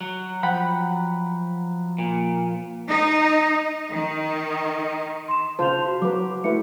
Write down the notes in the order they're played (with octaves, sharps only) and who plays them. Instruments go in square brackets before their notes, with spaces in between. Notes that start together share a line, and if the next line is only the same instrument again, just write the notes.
[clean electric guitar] F#3
[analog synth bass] F3 [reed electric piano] F#5 G5 B5
[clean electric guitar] A#2
[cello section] D#4
D#3
[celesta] C6 E7
[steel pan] C#3 F4 C5 [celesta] A5 F7
[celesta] F#4
[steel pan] F#3 B4 [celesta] D6
[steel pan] A3 E4 B4 [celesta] C#7